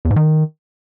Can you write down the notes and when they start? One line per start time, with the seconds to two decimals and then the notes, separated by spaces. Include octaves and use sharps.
0.05 E2
0.11 G#2
0.16 D#3